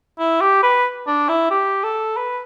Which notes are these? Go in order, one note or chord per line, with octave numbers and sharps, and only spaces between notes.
E4
G4
B4
D4
E4
G4
A4
B4